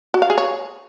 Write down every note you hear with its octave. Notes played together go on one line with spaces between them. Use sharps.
F#4
F5
G#4
C#5